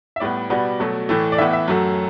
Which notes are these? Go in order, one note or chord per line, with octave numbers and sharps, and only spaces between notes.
E5
A2 G3 B3 D5
B2 G3 B3
B2 F#3 A3
A2 E3 A3
D5
A2 E3 B3 E5
E5
F#2 F#3 A3